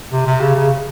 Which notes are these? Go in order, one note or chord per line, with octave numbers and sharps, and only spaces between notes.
C3
C3
C#3
C#3